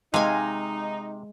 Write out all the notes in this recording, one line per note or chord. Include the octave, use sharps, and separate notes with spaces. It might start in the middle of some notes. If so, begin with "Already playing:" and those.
C3 G#3 D#4 F5 G#5